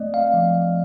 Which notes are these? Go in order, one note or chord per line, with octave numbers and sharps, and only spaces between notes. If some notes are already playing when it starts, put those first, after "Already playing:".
Already playing: A3 C4 D5 D#5
F5
F3